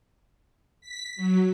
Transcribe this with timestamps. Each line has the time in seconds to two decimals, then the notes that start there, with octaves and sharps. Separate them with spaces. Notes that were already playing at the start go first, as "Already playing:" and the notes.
0.81 B6
1.16 F#3